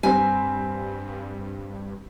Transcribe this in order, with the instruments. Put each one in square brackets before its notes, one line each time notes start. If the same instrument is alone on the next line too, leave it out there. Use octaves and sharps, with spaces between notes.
[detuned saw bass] G2 [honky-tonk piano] G3 C4 [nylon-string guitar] G#5